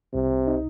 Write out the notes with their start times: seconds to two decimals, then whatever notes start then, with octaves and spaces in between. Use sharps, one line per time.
0.14 C2 C3
0.31 C2
0.47 D#4